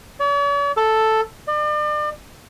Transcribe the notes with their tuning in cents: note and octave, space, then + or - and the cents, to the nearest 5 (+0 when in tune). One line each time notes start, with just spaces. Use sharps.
C#5 +45
A4 +0
D5 +40